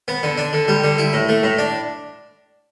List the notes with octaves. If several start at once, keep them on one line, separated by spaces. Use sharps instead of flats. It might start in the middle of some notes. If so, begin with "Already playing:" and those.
B3
D3
D4
D3
G3
D3
E4
A2
A3
A2
D4